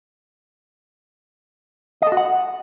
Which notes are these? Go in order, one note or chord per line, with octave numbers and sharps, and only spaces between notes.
D#5
A4
F#4
F#5